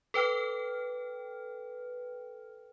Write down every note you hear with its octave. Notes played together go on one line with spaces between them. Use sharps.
A4 B4 G5 F6